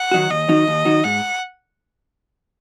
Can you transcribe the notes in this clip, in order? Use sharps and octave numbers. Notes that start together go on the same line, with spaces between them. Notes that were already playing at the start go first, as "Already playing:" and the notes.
Already playing: F#5
D#3 F#3 D#4 F#4
D#2 D#5
D#3 F#3 D#4 F#4
D#2
D#3 F#3 D#4 F#4
G#2 F#5